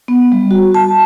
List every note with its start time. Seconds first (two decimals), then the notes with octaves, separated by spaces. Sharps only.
0.08 B3
0.32 G3
0.51 F#4
0.74 A5